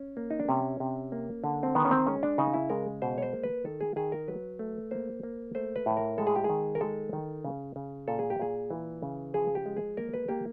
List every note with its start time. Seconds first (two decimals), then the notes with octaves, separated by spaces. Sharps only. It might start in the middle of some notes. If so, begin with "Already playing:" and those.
Already playing: C#4
0.17 A#3
0.31 D#4
0.40 D4
0.49 C3 C#4
0.80 C3
1.12 A#3
1.44 D3
1.63 C4
1.75 D#3 B3
1.85 C#4
1.91 C4
2.07 G#3 C#4
2.23 D4
2.38 C#3 D#4
2.54 E4
2.70 G#3 A#4
3.02 B2 C5
3.18 C#5
3.22 C5
3.33 A#3
3.44 B4
3.65 D#3 A4
3.81 G#4
3.96 D#3 G#4
4.12 A#4
4.28 F#3 B4
4.59 A3
4.91 A#3 C5
5.23 A#3
5.55 A3 C5
5.76 B4
5.86 A2
5.97 A#4
6.18 G#3 A4
6.27 G#4
6.36 G4
6.44 G#4
6.49 D#3
6.75 A#4
6.81 G#3 A4
7.13 D#3
7.45 C#3
7.76 C#3
8.08 A#2 A4
8.19 G#4
8.30 G4
8.39 A#2 G#4
8.70 E3
9.03 C#3
9.34 F3 G#4
9.55 G4
9.66 G#3
9.77 G#4
9.97 A#3 A#4
10.14 B4
10.29 A#3 G4